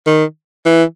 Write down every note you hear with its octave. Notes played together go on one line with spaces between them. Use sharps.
D#3
E3